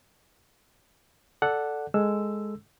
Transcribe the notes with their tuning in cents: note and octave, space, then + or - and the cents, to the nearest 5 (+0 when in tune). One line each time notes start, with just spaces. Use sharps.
A4 +0 D5 +0 F#5 +0
G#3 +0 A4 +0 E6 +5